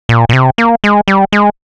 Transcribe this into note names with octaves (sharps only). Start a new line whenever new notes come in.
A#2
A#2
C3
A#3
G#3
G3
G#3